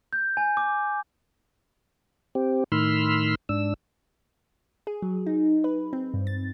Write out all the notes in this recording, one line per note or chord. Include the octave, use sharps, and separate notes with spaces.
G6
G#5
D6
C4 G4
A2 D#3 B5 C6 E6 F6
G#2 D4 E6
G#4
F#3
D#4
B4
C4
G2
A6